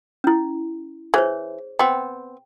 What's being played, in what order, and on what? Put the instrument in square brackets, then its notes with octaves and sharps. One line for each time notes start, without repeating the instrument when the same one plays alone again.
[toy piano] C#4 E4
[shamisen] E3 [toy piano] G#4 C5 C#5
[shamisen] B3 C4 [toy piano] G5